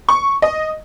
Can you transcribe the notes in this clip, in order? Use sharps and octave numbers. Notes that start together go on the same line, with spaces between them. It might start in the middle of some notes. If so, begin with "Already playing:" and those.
C#6
D#5